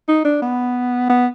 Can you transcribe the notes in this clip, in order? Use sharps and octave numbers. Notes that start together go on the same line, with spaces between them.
D#4
D4
B3
B3